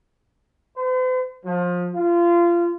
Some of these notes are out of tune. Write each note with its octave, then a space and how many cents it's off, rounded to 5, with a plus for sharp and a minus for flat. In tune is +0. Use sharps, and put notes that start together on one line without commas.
C5 -45
F3 +25
F4 -25